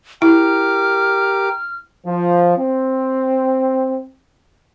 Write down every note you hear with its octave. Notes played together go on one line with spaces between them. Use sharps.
E4 G4 A#4 D6 F6
F3
C4